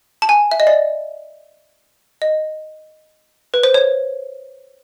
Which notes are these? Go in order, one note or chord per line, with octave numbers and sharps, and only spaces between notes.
A5
G#5
E5
D#5
D5
D#5
B4
C5
C#5